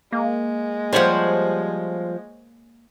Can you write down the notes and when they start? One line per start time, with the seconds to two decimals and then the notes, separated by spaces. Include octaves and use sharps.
0.12 G#3 A#3
0.93 F3 G3 C5 C#5 F#5